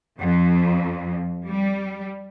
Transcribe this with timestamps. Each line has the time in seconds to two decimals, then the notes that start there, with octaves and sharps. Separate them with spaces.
0.22 F2
1.48 G3